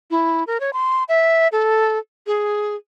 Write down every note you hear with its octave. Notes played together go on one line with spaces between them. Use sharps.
E4
A#4
C#5
C6
E5
A4
G#4